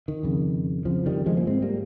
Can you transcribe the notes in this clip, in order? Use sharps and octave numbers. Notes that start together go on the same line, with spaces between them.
D#3
F2 C#3
F2 C#3 F3
D#3 G3
F3 G#3
A#3
G#2 G#3 C4
G3 A#3